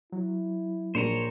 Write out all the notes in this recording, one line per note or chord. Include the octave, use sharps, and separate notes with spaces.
F#3 E4
A#1 D4 A#4 C5 C#5 A#5 D#7